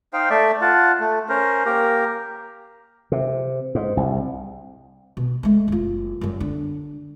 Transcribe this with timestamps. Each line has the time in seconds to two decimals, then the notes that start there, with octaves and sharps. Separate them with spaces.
0.13 D#4 C5 F5 G5
0.30 A3 D5 E5
0.61 F4 F#5 A5
1.00 A3
1.29 C#4 A#4 C5
1.65 A#3 G4 A#4
3.12 C3
3.75 G#2
3.97 C2
5.17 B2
5.43 G#3 A3
5.68 F#1 F4
6.21 F#2 G3
6.40 D3 D4